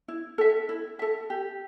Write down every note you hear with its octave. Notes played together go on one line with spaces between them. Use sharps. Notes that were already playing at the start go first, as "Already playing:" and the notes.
E4
A4 E5
E4
A4 E5
G4